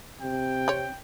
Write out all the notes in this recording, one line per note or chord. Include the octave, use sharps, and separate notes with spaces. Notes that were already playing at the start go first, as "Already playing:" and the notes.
C3 G5
C4 C#5